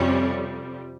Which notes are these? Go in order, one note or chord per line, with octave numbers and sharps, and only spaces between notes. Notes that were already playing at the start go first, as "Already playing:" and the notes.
Already playing: F2 C3 G3 C#4 C#5